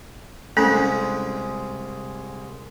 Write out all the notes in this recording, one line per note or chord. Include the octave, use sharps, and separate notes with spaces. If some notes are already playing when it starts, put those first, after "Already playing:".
C2 G#3 A3 C#4 A4